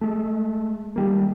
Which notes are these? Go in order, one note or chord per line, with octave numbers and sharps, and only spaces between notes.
G#3 A3
D#3 G3 A#3